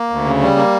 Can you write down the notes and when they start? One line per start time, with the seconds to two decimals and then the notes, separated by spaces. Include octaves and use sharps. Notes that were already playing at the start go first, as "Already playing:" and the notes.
Already playing: A#3
0.10 D2
0.25 C#3
0.41 G3
0.56 A#3